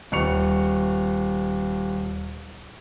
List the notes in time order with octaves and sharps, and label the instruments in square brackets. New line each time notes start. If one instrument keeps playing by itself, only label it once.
[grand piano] D#1 C#6 C#7 F7